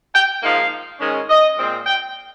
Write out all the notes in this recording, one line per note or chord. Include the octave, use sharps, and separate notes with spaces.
G5
G#2 F3 A#3 D#4 F5
G#2 D#3 G#3 C#4
D#5
A#2 G#3 C4
G5